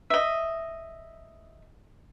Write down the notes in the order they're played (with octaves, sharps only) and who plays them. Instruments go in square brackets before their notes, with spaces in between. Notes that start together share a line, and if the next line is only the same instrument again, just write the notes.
[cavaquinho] D#5 E5